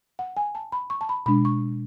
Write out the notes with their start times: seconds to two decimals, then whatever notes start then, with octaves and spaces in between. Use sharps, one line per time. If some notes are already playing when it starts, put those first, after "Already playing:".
0.19 F#5
0.37 G#5
0.55 A5
0.72 B5
0.90 C#6
1.01 A5
1.09 B5
1.26 B2 G#3 D4 B5
1.45 C#6